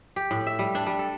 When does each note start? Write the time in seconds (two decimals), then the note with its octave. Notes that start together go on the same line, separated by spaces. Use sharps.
0.16 G4
0.31 A2
0.47 E5
0.59 G3
0.75 D4
0.86 G3
0.99 A4